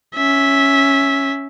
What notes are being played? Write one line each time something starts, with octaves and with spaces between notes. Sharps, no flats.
C#4 E5